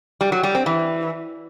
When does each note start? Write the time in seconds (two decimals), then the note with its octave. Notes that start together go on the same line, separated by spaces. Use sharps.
0.21 G3
0.32 F#3
0.43 G3
0.55 C4
0.66 E3